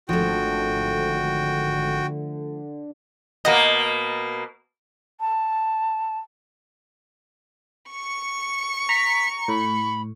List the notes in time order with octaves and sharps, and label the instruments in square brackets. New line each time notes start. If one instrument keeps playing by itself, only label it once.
[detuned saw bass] G#1 [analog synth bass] D3 [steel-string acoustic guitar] F3 A3 [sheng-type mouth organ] F#4 G5
[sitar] B2 A#3 [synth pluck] D#5 F#5
[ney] A5
[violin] C#6 C#7
[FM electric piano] A#5 [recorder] B6
[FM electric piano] A2 [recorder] B5